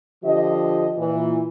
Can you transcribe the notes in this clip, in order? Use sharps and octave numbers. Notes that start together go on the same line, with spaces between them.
D3 F3 G4 D#5
A#2 E3